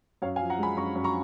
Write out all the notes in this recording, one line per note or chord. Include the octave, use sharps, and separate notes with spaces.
F#2 C#5 F5
F5 G#5
F3
F#5 A#5
G#3 G#5 B5
F#2 A#5 C#6
F#2
A#5 C#6